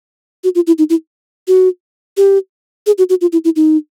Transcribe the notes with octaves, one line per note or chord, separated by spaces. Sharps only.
F#4
F4
E4
D#4
E4
F#4
G4
G#4
F#4
F#4
F4
E4
E4
D#4